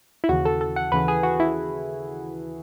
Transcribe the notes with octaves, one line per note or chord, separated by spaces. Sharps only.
E4
D#2 C#3 E3 F#4
A4
A4
F#5
D#2 C#3 E3 B4
G#4
F#4
E4